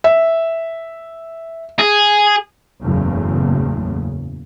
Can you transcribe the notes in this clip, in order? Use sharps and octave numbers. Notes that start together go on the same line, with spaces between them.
E5
G#4
F#1 E2 A2 C#3